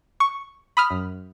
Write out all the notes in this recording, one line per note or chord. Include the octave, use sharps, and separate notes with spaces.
C#6
B5 D#6 F6
F#2